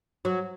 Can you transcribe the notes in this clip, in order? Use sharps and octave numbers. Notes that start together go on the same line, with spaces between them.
F#3